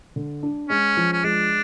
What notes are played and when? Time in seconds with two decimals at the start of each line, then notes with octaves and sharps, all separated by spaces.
0.16 D3
0.43 D4
0.69 G#3 C#4
0.97 F3
1.13 C#4
1.24 G#3 D4